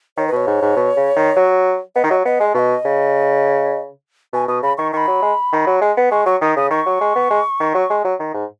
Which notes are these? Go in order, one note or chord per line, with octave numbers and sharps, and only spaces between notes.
D#3 C#5
B4
B2 C#5
G#2
G#2
B2
C#3
D#3
F#3
B3 D#5
D#3
F#3
B3 D#5
G#3
B2 D#5 F5
C#3
B2 G#5
B2 D#6
C#3 B5
D#3 C#6
D#3 B5 C#6
F#3
G#3
D#3
F#3
G#3
B3
G#3 C#6
F#3 C#6
D#3 D#6
C#3 D#6
D#3 C#6
F#3
G#3
B3
G#3
D#3
F#3
G#3
F#3
D#3
G#2